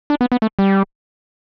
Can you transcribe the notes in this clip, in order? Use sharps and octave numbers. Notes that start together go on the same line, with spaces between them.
D4
B3
B3
A3
G3